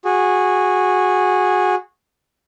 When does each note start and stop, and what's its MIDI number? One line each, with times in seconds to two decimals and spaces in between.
0.05 1.75 66
0.05 1.75 68